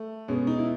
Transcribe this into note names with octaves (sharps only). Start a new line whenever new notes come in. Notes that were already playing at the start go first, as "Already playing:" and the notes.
Already playing: A3
B2 G#3 B3 C#4
D#4
E4